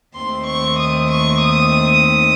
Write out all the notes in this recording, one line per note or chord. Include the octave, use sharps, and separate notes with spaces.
D#2 D#3 A3 C4 C6
C#6
D#6
C#6
D#6